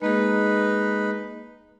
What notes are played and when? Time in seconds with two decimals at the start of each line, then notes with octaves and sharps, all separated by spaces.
0.02 G#3 A#3 D#4 G#4 B4